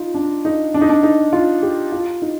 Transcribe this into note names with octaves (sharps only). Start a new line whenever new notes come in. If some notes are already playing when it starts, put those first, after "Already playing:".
Already playing: D#4 F4
D4
D#4
D4
D#4
D4
D#4
F4
G4
F4
D#4